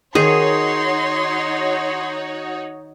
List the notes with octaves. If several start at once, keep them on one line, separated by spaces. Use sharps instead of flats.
D#3 D#4 F#4 G#4 C#5 C6